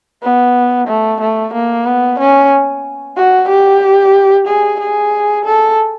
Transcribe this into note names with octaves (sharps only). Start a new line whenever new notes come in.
B3
A3
A3
A#3
B3
C#4
F#4
G4
G#4
G#4
A4